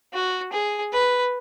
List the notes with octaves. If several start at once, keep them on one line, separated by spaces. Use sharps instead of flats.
F#4
G#4
B4